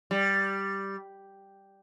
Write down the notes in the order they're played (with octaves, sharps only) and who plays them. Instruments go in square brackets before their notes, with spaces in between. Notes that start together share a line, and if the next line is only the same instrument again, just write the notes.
[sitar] G3